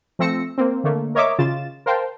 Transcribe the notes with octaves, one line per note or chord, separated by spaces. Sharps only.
F3 A3 C4 E6 A#6 C#7
A#3 C4
D3 A3 A#3
A#4 C#5 D#5 E5 D6
C#3 F4 A6 E7
A#4 C5 F5 G5 A5